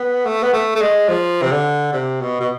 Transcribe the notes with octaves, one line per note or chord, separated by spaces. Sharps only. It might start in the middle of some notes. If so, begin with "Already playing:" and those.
Already playing: B3
A3
B3
A3
A3
G#3
F3
C3
D3
C3
B2
B2